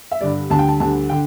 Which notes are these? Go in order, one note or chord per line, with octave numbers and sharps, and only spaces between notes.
E5
G2 D3 G3 D5
D2 D3 G3 A5
G5
A5
D2 D3 G3 A5
D3 G5